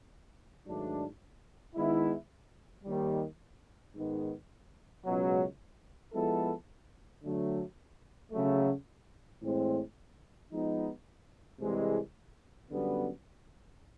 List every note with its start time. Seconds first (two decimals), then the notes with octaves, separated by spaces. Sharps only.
0.66 G#2 D#3 F#3 A3 D4
1.75 D#3 G#3 B3 E4
2.84 D#2 D#3 G3
3.94 G#2 D#3 G#3 B3
5.04 C#2 B2 F#3
6.13 F3 G#3 B3 E4 A4
7.23 D3 F#3 A3
8.32 C#3 F#3 A3
9.42 A2 E3 G#3 C4
10.51 F3 G#3 B3 D#4
11.60 C2 C3 E3 G#3
12.70 F#2 D3 G3 B3